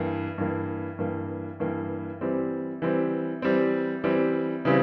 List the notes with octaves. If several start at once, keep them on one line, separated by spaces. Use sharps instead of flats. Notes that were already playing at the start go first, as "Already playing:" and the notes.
Already playing: G2 E3 A#3
G2 E3 A#3
G2 E3 A#3
G2 E3 A#3
E3 G3 C4
E3 G3 C4
E3 G3 C4
E3 G3 C4
C#3 E3 G3 C4